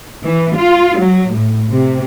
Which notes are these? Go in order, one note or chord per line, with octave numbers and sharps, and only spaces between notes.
E3
F4
F#3
A2
C3